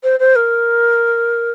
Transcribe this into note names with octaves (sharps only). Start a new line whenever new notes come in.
C5
C5
A#4